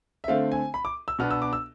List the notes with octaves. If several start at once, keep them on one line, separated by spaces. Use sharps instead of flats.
E5
D3 A3 C4 F5
G#5
B5
D6
E6
B2 B3 D4 F6
E6
D6
E6